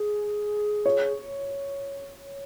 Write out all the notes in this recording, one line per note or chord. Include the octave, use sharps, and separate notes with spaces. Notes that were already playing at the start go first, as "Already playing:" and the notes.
Already playing: G#4
C#5